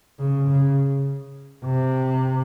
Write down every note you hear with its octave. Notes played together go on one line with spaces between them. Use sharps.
C#3
C#3
C3